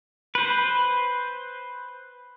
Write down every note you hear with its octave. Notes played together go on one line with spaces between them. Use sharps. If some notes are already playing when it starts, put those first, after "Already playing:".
B4 C5